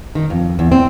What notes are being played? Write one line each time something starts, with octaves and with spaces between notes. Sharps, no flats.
D#3
F2
E2
C4